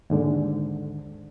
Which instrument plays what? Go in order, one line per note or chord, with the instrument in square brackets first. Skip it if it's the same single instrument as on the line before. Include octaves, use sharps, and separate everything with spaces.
[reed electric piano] D#2 G#2 D3